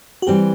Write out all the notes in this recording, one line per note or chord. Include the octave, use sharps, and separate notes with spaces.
F#4
E3 G3 C4 G4